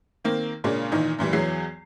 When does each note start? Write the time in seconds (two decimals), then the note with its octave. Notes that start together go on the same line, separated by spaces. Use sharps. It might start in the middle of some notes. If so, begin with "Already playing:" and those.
0.24 D#3 A#3 C4
0.64 A#2 C#3 G#3 A#3 C#4 D4
0.92 A#2 D#3 E3 D#4
1.19 F#2 A#2 E3 G3
1.33 E2 E3 F#3 G#4 C7